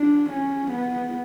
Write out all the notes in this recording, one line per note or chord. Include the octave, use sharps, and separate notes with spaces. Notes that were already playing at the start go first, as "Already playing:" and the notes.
Already playing: D4
C#4
B3